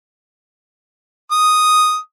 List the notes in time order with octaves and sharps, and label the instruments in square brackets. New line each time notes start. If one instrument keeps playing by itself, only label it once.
[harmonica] D#6